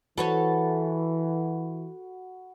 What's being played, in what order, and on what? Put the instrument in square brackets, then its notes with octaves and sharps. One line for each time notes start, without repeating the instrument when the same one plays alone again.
[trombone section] E3 [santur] F#4 B5 [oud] A4 B4 C#5